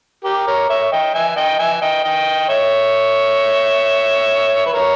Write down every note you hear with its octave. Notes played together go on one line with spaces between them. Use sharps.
G4 A#4
A#4 C#5
C#5 E5
D#5 G5
E5 G#5
D#5 G5
E5 G#5
D#5 G5
D#5 G5
C#5 E5
B4
A#4 C#5